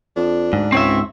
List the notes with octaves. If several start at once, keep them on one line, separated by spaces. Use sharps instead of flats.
F2 D4
D2 G#2
C#2 C4 C#5 E5